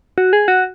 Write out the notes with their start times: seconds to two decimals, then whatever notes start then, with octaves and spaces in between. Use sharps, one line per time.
0.18 F#4
0.33 G#4
0.48 F#4